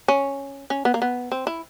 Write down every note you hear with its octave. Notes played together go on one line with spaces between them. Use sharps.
C#4
C#4
B3
A#3
B3
C4
E4